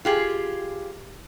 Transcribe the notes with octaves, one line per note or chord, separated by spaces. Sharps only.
F4 G4 G#4